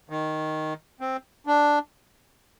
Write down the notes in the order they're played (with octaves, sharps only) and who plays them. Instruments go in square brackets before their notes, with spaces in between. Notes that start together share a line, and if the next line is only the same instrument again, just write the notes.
[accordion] D#3
C4
D4